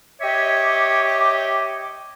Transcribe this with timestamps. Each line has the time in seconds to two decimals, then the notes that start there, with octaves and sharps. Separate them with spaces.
0.21 G4 C#5 D#5 E5 D6